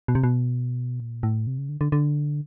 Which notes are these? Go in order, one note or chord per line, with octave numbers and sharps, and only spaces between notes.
B2
C3
B2
A#2
A2
C3
C#3
D3
D3
D3